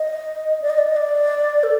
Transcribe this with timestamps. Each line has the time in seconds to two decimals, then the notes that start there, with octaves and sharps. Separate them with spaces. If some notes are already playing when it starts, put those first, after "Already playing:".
Already playing: D#5
0.62 D5
0.70 D#5
0.78 D5
0.87 D#5
0.96 D5
1.63 A4